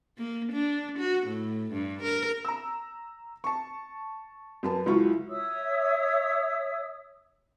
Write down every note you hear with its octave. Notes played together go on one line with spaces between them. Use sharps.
A#3
D4
F#4
A2
G2
A#4
A#5 E6
A5 C#6
F#2 B4 A5
C#2 F#3 E4 F4 C#6
C#5 E5 D#6 E6